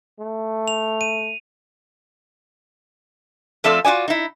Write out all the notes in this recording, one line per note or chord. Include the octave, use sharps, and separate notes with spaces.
A3
F7
D#7
F3 A3 C4 F4 A4 D5
F4 F#4 D5 G#5
D#4 E4